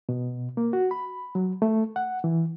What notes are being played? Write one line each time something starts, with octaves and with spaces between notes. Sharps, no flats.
B2
A#3
F#4
B5
F#3
A3
F#5
E3